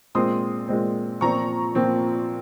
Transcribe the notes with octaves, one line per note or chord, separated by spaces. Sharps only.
A#2 G#3 C4 C6 D#6
A#2 G#3 C4
A#2 F3 C4 A#5 C#6
A#2 F3 C4